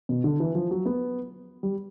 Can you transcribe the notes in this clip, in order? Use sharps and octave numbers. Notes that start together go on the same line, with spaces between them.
B2
D3
E3
F3
F#3
B3
G3